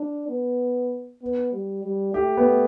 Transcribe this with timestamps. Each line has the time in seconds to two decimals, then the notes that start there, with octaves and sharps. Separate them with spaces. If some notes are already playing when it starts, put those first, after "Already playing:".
Already playing: D4
0.29 B3
1.22 B3
1.53 G3
1.83 G3
2.13 A3 G4
2.37 B3